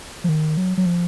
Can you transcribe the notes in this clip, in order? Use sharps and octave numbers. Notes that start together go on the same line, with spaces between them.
F3
D#3
F#3
F#3
F3